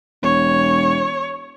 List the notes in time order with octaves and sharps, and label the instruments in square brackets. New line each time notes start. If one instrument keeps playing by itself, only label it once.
[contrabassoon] E1 [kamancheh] C#5